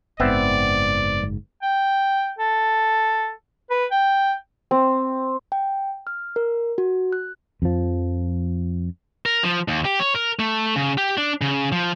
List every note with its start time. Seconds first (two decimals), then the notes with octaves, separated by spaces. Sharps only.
0.20 F#1 G#2 B3 C4 D5 E5
1.63 G5
2.39 A4
3.71 B4
3.91 G5
4.71 C4
5.52 G5
6.07 F6
6.36 A#4
6.78 F#4
7.12 F#6
7.62 F2 F3
9.26 A#4
9.43 F3
9.68 D#2
9.85 G4
10.00 C#5
10.15 A#4
10.39 A3
10.76 C#3
10.98 G4
11.18 D4
11.42 C#3
11.72 F3